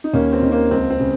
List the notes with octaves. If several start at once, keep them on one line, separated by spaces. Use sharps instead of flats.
D#4
D#2 A#3 C#4
C4
D#3
A#3
C#2 C4
C4
C#3